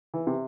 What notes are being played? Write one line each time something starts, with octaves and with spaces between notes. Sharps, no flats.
E3
C3